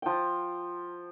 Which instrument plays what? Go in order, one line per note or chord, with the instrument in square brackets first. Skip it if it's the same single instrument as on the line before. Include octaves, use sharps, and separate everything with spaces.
[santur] F3 G5